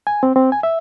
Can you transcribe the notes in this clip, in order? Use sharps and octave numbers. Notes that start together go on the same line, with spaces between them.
G#5
C4
C4
G#5
E5